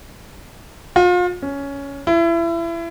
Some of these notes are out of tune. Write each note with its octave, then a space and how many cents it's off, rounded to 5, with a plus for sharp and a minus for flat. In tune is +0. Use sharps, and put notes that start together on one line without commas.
F4 +35
C#4 +10
E4 +30